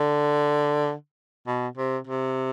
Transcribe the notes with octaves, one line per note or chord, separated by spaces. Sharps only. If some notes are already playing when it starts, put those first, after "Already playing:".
Already playing: D3
B2
C3
C3